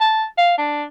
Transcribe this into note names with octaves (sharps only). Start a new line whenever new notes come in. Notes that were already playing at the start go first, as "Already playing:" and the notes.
A5
F5
D4